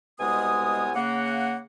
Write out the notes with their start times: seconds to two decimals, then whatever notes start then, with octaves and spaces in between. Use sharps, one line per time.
0.19 C2 B2 G#3 B3 G#5 D#6
0.95 C#3 A#3 F#5